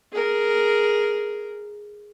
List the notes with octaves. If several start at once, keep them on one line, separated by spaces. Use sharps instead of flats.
G#4 A#4